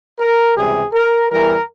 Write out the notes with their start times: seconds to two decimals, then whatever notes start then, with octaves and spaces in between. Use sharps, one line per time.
0.19 A#4
0.55 C#2 C3 E3 G3 G#4
0.92 A#4
1.29 E2 E3 G3 A#4